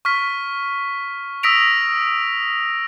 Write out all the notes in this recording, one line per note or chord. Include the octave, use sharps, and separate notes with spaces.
C#6 F6 B6
D#6 E6 A#6 B6 D7 F7